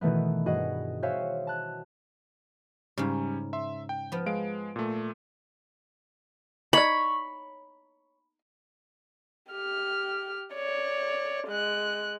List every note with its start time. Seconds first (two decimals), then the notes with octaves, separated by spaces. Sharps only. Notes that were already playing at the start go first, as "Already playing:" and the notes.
0.01 B2 D#3 E3 A3 B3
0.46 G2 F#4 G#4 D#5 F#5 D#6
1.02 F#4 C5 C#5 E5 F5 G#5
1.47 A5 F#6
2.98 G#2 C#3 G3 C#4
3.53 E5 C6
3.89 G5
4.12 F3 B3
4.26 G#3 F5 D7
4.76 A#2 A3
6.73 D#4 C#5 D5 B5
9.51 G4 F6
10.55 C#5 D5
11.47 G#3 F#6